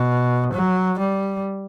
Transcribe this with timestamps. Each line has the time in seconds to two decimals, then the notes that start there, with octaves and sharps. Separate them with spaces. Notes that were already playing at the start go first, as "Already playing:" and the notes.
Already playing: B2
0.53 F#3
0.99 G3